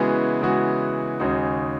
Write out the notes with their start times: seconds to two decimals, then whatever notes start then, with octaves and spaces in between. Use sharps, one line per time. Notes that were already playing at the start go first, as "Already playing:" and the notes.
Already playing: C#3 E3 G#3 B3 F#4
0.41 C#3 E3 G#3 B3 F#4
1.20 D#2 C#3 G#3 D#4 F#4